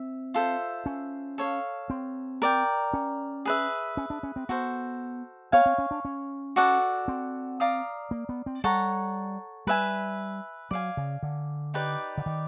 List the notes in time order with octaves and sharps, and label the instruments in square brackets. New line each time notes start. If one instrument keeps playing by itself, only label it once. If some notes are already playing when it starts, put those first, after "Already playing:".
Already playing: [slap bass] C4 [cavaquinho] E5
[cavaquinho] F4 A4 C5 E5
[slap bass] C#4
[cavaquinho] A4 C#5 F5
[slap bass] C4
[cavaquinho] A#4 D5 G5
[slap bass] C#4
[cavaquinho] G#4 B4 E5
[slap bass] C#4
D4
C#4
C4
[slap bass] B3 [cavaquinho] F#4 A4 C5
[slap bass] B3 [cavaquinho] C#5 F5 G#5
[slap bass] C4
C#4
D4
C#4
[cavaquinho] F#4 A4 D5 F#5
[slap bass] C4
[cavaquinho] D5 F5 A#5 D#6
[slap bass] A#3
B3
C4
[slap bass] G3 [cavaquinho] A4 C#5 F#5 A#5
[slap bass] G3 [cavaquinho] B4 E5 G#5
[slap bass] F#3 [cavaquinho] D5 F5 G#5
[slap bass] C#3
D3
[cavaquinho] D#4 G4 B4 D5
[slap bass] D3
D#3